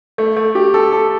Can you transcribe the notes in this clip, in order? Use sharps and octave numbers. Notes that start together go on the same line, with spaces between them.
A3
A3
G4
A4
A4